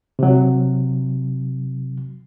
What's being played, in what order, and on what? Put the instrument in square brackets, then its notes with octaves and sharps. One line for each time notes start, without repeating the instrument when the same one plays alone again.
[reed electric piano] C3 F#3